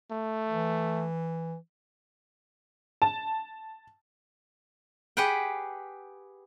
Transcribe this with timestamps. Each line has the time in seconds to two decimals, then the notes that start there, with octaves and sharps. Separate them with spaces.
0.11 A3
0.49 E3
3.02 A5
5.17 G4 G#4 B4 F#5 G5